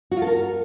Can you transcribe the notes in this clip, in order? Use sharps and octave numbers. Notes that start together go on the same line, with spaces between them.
F#4
F4
A4
A#4